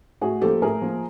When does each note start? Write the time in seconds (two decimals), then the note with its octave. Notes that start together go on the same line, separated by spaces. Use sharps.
0.21 A2 F#4 G#4
0.41 F3 A#3 G4 A4
0.62 A2 G#4 A#4
0.82 F3 A#3